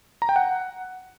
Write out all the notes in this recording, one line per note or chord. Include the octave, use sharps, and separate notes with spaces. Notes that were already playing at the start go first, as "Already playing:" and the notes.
A#5
G5
F#5